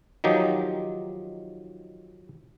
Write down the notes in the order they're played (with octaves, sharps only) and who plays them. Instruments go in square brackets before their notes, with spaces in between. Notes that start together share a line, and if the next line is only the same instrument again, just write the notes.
[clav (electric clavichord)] D#3 F3 F#3 D#4 G4